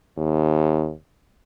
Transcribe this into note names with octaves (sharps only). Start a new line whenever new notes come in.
D#2